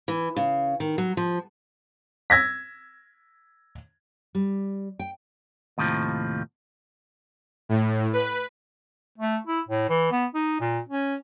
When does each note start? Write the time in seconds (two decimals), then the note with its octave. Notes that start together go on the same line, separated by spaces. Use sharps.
0.08 E3
0.36 C#3
0.80 D#3
0.98 F#3
1.17 F3
2.30 E6 G#6 A#6 B6
4.35 G3
4.99 G5
5.78 D#2 A2 C3 E3 F3
7.69 A2
8.13 B4
9.18 A3
9.47 E4
9.69 A2
9.89 E3
10.12 B3
10.35 D#4
10.61 A#2
10.89 C#4